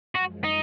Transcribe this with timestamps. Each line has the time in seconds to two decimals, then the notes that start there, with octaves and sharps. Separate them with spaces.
0.15 F#2 F3 G#3 F#4
0.44 D#4